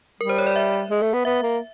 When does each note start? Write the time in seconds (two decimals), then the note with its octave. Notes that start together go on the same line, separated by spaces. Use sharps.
0.21 G3 A#4
0.29 C5
0.38 C#5
0.47 D5
0.56 E5
0.90 G#3
1.02 A3
1.14 B3
1.25 B3 E5
1.42 A#3